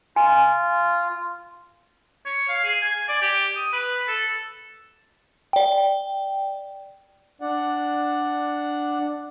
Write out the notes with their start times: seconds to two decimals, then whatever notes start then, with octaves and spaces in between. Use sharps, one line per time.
0.16 F4 G#5
2.26 C#5
2.49 F5
2.64 G#4
2.82 G#5
3.08 D5
3.22 G4
3.56 D#6
3.73 B4
4.08 A4
5.53 D5 G5
7.41 D4 D5 F#5